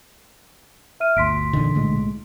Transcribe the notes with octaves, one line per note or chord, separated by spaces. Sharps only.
E5 F6 D#7
G1 D2 C6 B6 D7
A#1 E2 A#2 D3 D#3
B1 A2 G#3